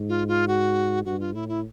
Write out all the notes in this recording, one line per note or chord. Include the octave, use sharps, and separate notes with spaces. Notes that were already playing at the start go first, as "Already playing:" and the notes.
Already playing: G#2
F4
F4
F#4
G2 F#4
F4
A2 E4
E4